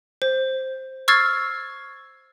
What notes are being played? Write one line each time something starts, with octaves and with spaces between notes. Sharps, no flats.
C5
C#6 E6 F6 G#6 A6 C7